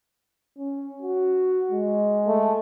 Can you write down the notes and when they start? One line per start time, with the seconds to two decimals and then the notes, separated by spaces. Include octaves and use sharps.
0.58 C#4
1.02 F#4
1.72 G#3
2.27 A3